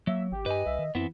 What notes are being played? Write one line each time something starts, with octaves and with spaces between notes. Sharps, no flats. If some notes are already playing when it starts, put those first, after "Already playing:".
F#3 A#3 E5
G#1 G4
G2 B4 D#5 G#5
C2 E5
D#3
F#2 E3 B3 C4